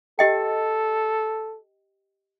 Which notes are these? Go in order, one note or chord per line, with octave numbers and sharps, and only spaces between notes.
G4 A4 D#5 G5